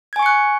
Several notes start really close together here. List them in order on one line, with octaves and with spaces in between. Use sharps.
G#6 G#5 C#6 C#7 F#6